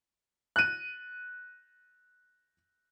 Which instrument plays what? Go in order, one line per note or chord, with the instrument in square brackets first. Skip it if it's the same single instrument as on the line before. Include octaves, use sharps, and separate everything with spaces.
[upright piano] F#6 D#7